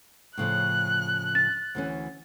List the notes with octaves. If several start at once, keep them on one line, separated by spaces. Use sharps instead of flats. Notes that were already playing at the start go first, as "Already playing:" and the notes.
A2 C#3 F3 F#6
A6
D2 E3 C#4